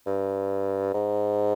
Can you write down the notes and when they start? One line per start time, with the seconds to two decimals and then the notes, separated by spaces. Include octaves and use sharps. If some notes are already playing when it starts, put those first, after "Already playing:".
0.07 G2
0.94 G#2